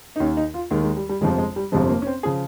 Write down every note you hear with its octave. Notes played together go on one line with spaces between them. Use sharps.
D#4
D#2 D#3 C#4
D#4
F4
D#2 D#3 G#3
G#3
G3
G3
G1 F2 C3 F3 G#3
G#3
G3
G1 F2 C3 F3 G#3
A#3
C#4
C4
C#3 F3 G#4